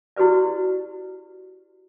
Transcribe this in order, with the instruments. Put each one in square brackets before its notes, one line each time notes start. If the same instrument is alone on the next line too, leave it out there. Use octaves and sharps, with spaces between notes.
[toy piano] E4 F#4 G4 B4 D5